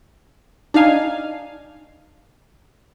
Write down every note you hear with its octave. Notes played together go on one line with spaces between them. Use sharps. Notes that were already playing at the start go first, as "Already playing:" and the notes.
D4 D#4 F5 G#5